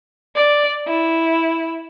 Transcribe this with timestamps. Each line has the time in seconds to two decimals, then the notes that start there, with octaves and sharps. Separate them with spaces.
0.35 D5
0.87 E4